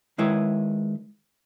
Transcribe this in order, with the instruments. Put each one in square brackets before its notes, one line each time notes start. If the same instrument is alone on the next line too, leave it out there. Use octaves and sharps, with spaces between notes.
[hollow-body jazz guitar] D#3 G#3 E4 B4 C#5